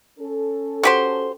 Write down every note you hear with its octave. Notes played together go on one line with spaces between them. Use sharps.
C#4 A4
F#4 G4 C5